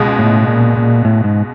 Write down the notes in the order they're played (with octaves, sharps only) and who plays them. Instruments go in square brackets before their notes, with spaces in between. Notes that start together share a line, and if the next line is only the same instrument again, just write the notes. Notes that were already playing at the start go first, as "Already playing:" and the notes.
Already playing: [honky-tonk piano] C#2 B2 G#3
[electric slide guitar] A2
A#2
A#2
A2
G#2